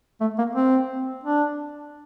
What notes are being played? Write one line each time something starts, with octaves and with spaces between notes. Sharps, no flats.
A3
A#3
C4
D4